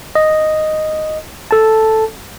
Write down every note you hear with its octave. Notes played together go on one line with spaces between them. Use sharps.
D#5
A4 A5